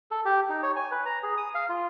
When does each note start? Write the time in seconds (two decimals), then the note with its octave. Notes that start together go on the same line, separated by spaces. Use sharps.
0.11 A4
0.25 G4
0.49 D#4
0.63 C#5
0.76 G#5
0.91 B4
1.06 A#5
1.23 G#4
1.37 D#6
1.55 F5
1.69 F4